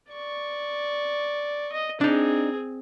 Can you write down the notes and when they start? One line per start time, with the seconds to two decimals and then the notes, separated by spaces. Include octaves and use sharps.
0.11 D5 C#6
1.72 D#5
2.01 C4 D4 D#4 G#4